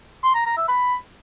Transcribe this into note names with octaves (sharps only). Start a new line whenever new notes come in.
C6
A#5
A#5
E5
B5